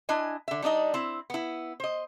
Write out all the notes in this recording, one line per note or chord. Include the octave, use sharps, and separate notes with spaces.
D4 E4 D#5 G#5
D3 E5
G3 D4 D#4 D#5
C4 E4
B3 E4
C5 D#5